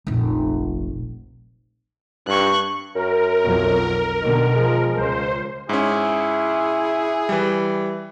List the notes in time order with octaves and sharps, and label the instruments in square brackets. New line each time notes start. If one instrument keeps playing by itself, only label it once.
[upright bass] F1 A#1
[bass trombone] G2 [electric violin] C#6 F#6
[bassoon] F#2 [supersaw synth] A#4
[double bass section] B1 F2 F#3
[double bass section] B2 D3 [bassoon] D#3
[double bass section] F3 [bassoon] G#3
[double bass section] C#2 [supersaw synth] C5
[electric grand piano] G#2 C#4 [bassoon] E4 [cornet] G#4
[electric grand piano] E3 G3